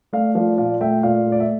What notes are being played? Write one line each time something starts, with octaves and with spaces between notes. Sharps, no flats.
A3 D5 F5
F3 D5 F5
A#2 D5 F5
A3 E5 G5
A#2 D5 F5
A3
D5
E5